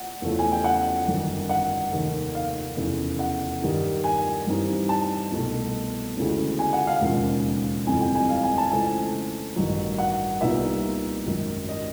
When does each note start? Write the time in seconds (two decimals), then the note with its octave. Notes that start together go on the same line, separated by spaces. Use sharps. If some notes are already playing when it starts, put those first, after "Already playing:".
Already playing: F#5
0.22 E2 C#3 F3 A3 C#4
0.39 G#5
0.52 G5
0.64 F#5
1.08 G1 F#2 D#3
1.49 F#5
1.93 F1 D#2 D#3
2.35 F5
2.77 F1 E2 C#3
3.19 F#5
3.62 G2 D#3 G3
4.04 G#5
4.47 G2 E3 G3 C4 D#4
4.89 A5
5.32 C2 B2 F#3 A3
6.16 D2 C#3 E3 G#3 C#4
6.59 G#5
6.73 F#5
6.87 F5
7.01 E1 D#2 C#3 F3
7.86 G1 F2 C3 E3 G#5
8.01 G5
8.15 G#5
8.29 F5
8.43 G#5
8.58 A5
8.72 C#2 C#3 E3 A3 C4 G#5
9.56 A1 G2 D#3 F#3
9.98 F#5
10.41 C2 A#2 G3 B3 D#4 E5
11.26 G#1 F#2 D#3
11.69 D#5